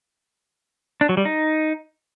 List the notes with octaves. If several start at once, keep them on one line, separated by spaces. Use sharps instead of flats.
D4
F#3
G3
D#4